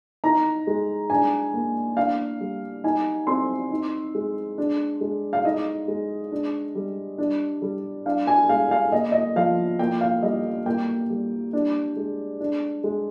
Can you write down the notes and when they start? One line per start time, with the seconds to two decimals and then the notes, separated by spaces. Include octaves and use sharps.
0.24 D#4 A#5
0.67 G#3
1.10 D4 G#5
1.54 A#3
1.97 D4 F5
2.41 G3
2.84 D#4 G#5
3.27 C4 C6
3.71 D#4
4.15 G#3
4.58 D4
5.01 G#3
5.33 F5
5.45 D#4 D#5
5.88 G#3
6.32 D4
6.75 G3
7.18 D4
7.62 G3
8.06 D4 F5
8.27 G#5
8.49 G#3 F5
8.71 F5
8.92 A#3 D#5
9.12 D#5
9.36 F3 F5
9.79 A#3 G5
10.01 F5
10.23 G3 D#5
10.66 A#3 G5
11.10 G3
11.53 D4
11.96 G#3
12.40 D4
12.84 G#3